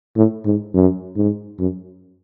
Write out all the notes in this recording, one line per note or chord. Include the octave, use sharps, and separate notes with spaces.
A2
G#2
F#2
G#2
F#2